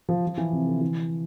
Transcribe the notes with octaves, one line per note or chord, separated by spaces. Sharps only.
F3
F3
E3
C3
D3
E3